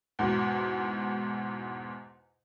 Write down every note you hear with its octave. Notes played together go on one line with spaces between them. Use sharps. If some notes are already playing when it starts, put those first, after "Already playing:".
E2 G#2 B2